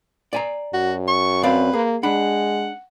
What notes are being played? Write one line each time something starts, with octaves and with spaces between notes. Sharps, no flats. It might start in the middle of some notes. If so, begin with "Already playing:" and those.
D5 G#5 A#5
F#2 F#4
C#6
C4 B4 D5 F5
A#3 G#4
G#3 D4 F#5 B5